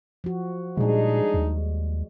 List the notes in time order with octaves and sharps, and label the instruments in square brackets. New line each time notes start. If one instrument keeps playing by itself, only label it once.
[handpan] F3 F#4
[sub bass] A#2 [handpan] G3 G#3 [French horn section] D4 D#4 G#4
[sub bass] D#2